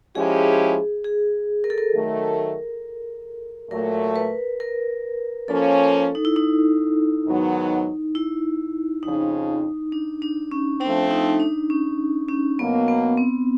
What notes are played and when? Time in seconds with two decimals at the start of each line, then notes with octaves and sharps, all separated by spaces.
0.15 F3 G#3 C#4 E4 G4 G#4
1.04 G#4
1.64 A#4
1.70 A4
1.78 A#4
1.94 D#3 F#3 A3
3.70 A#2 F#3 A3 A#4
4.16 B4
4.60 A#4
5.48 F3 A#3 C#4 A4
6.15 D#4
6.25 E4
6.36 D#4
7.26 G#2 D#3 F#3 B3
8.15 E4
9.03 F2 C#3 F3 D#4
9.92 D4
10.22 D4
10.51 C#4
10.81 F3 A3 C4 D4
11.11 D#4
11.40 D4
11.70 C#4
12.28 C#4
12.59 B2 F#3 A#3 B3
12.88 B3
13.17 C4